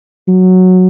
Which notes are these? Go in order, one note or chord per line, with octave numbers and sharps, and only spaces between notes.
F#3